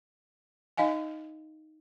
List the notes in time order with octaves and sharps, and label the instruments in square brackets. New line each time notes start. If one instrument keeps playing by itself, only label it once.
[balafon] D#4 D#5 F5 G#5